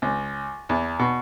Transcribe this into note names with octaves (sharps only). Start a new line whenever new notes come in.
C#2
E2
B2